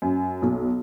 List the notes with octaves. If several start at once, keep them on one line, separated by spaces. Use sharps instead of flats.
F#2
B1